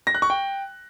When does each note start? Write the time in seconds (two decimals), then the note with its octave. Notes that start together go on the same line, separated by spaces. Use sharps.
0.07 A#6
0.15 F#6
0.22 C#6
0.30 G5